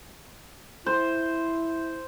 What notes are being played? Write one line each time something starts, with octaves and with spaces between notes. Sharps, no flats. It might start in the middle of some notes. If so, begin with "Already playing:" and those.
E4 C5